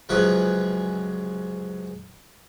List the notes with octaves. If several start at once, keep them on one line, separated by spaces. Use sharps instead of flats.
C#2 F#2 C3 F3 G#4 B4